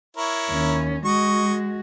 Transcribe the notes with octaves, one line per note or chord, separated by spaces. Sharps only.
E4 A#4 C#5
D#2 C#4
G#3 F#4 D#5 C#6